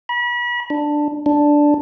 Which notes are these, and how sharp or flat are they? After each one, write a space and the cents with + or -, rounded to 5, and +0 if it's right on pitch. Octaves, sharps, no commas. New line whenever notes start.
B5 -35
D4 +10
D4 +0